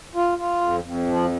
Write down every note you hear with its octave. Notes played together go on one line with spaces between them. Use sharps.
F4
F4
F2
F2
F3